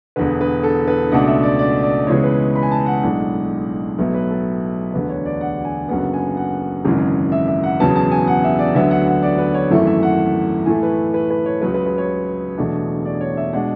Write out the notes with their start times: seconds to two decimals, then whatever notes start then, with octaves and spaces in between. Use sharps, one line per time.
0.16 E1 E2 D3 B4
0.41 B4
0.63 A4
0.88 B4
1.12 C#2 B2 A3 D4 F#5
1.28 E5
1.43 D5
1.59 D5
1.83 D5
2.07 C#2 C#3 E3 G#3 B3 C#5
2.24 B4
2.56 B5
2.63 G#5
2.71 A5
2.86 F#5
3.03 B1 A2 G#3 D4
3.98 B1 A2 F#3 B3 E4
4.15 B4
4.30 A4
4.94 E1 D2 D3 B4
5.09 C#5
5.25 D5
5.41 F#5
5.65 G#5
5.89 F#1 F#2 D3 F#3 B3 F#5
6.14 G#5
6.37 F#5
6.85 G#1 F#2 C#3 E3 G#3
7.32 E5
7.48 E5
7.63 F#5
7.80 E1 E2 C#3 F#3 B3 A5
7.96 A5
8.12 G#5
8.28 F#5
8.44 E5
8.59 D5
8.75 D2 D3 F#3 B3 E5
8.91 F#5
9.07 F#5
9.23 D5
9.38 B4
9.54 C#5
9.71 G#1 F#2 E3 A3 E4
9.87 E5
10.03 F#5
10.66 A2 E3 A3 G#5
10.83 B4
11.14 B4
11.30 B4
11.46 C#5
11.62 C#2 C#3 F#3 B4
11.74 B4
11.86 B4
11.98 C#5
12.57 E1 E2 B2 A3 D4
13.05 D5
13.21 C#5
13.37 E5
13.53 B2 G#3 D4 F#5